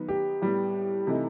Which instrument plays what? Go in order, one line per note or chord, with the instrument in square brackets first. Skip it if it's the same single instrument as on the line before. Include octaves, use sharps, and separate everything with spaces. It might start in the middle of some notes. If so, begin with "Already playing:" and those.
Already playing: [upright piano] D#3 F#3 B3 D#4
[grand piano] G4
[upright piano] A2 G3 B3
C3 E3 A3 D#4